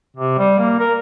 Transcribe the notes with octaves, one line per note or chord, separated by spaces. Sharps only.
C3
G3
A#3
A#4